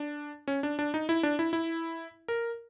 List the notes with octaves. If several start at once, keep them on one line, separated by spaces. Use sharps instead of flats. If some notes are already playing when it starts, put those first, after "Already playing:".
Already playing: D4
C#4
D4
D4
D#4
E4
D4
E4
E4
A#4